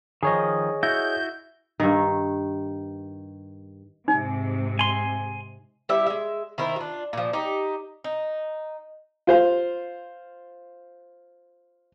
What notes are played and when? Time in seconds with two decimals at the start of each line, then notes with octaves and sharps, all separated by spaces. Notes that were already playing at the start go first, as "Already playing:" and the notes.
0.23 D#3 F3 G#4 C#5 D#5
0.83 E4 F#4 G6
1.80 G2 D#3
4.08 G#2 C3 G#3 D#4
4.79 G#5 C6
5.89 G3 E4 G4 E5
6.06 G#3 E5
6.58 D#3 E4 A#4 C5
6.76 D4 F4
7.13 A#2 F3
7.33 D#4 G4
8.04 D#4
9.27 F4 C5 F5